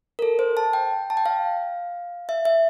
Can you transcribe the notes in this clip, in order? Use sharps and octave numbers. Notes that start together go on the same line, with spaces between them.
A#4
A4
C5
A5
G5
A5
G5
F5
E5
E5